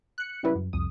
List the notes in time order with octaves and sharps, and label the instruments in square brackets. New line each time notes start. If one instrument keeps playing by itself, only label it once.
[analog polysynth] F#6 C#7
C#3 G3 E4 B4
F#2
C2 F2 D#6